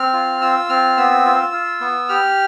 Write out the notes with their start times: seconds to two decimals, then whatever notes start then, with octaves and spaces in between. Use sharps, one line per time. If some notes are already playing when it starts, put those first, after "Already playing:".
Already playing: C4 F6
0.13 F4
0.41 F4 E6
0.69 C4 F6
0.97 B3 E6
1.25 F4
1.53 F4
1.81 B3
2.09 G4 F6